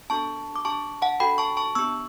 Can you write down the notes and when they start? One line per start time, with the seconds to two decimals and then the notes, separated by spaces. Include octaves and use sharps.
0.10 B3 D4 F#4 A4 A5 C#6
0.56 D6
0.65 D4 G4 A5 C#6
1.02 F#5 A5
1.20 D4 F#4 A4 G5 B5
1.38 A5 C#6
1.57 A5 C#6
1.75 B3 D4 G4 C#6 E6